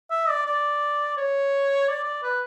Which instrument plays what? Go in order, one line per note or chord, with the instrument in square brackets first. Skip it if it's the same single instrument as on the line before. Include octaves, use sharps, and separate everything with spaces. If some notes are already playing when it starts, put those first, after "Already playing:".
[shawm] E5
D5
D5
C#5
D5
D5
B4